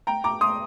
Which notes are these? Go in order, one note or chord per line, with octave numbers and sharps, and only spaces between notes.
G5 A#5
A#5 D6
C6 D#6